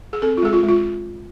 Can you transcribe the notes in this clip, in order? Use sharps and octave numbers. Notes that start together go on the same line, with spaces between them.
G#4
C4 A4
F4
G#3 G#4
F4
G#3
F4